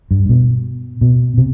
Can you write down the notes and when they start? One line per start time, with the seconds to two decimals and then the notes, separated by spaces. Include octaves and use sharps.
0.11 G2
0.29 B2
1.01 B2
1.38 C3